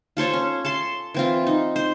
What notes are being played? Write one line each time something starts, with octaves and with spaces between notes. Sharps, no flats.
F4 A4 C5 C#5
C#4
A4 A5 C6
E3 C4 F4
D#4
C5